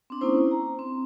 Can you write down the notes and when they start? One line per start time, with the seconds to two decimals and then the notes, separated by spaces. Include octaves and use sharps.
0.10 C4 D4
0.21 A#3 C#4 D#4 E4 C5
0.51 A#5
0.79 C4